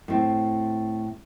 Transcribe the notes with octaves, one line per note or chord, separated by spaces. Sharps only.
A2 C4